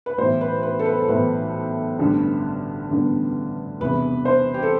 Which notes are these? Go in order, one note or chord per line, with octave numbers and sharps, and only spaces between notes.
B4
B1 A2 E3 C5
B4
B4
A4
B4
A4
B1 A2 E3 B4
A1 G2 D3 G3 B3
A1 G2 D3 G3 B3
E1 E2 C3 E3 G3 B4
C5
G4
A4